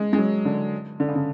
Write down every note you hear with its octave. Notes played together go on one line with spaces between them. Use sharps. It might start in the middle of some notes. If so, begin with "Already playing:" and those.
Already playing: G#3
G#3
F#3
D3
D3
C#3
D3